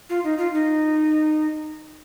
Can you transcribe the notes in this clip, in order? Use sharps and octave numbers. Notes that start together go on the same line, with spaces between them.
F4
D#4
F4
D#4